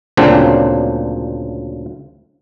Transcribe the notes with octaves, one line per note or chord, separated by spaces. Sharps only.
D2 A#2 C#3 F#3 C4 D4